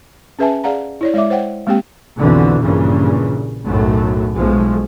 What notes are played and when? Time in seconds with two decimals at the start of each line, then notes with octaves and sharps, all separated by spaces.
0.39 C#4 G#4 B4 E5 G#5 A5
0.64 G#4 D5 F5 F#5 A#5
1.01 E4 C#5 D5
1.14 G#3 C#5 D5 E5 D6
1.30 C5 C#5 F#5 G5
1.67 G#3 A#3 C4 G4 G5
2.19 B1 F2 B2 D3 E3
2.62 A#1 G2 A#2 C#3 E3
3.66 B1 F#2 A2 A3
4.36 B1 F3 G#3 A3